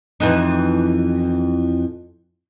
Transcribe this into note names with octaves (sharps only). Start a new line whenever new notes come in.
F2 E3 D#4